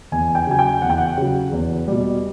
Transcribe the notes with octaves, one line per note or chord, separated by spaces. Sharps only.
E2 G#5
G5
C#3 F#3 G#5
G5
E2 F#5
G5
F#5
C#3 F#3
E2
B2 G3